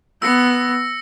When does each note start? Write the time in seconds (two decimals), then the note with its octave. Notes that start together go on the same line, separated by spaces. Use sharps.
0.22 B3 E6 A#6 C#7